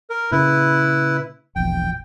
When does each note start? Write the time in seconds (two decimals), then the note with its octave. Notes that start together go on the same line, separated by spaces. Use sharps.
0.10 A#4
0.32 A#2 C#3 E4 B4
1.56 E1 A#1 E2 G5